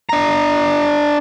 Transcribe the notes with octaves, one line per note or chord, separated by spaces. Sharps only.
D4 A#5